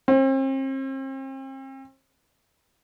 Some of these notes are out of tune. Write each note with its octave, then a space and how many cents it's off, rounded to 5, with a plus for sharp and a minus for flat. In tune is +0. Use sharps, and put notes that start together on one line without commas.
C4 +40